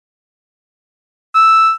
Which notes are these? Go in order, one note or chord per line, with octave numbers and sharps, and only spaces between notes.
E6